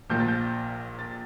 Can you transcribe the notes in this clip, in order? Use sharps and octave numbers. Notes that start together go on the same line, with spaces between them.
A#1 A#2 F3 G6
A6
G6
A6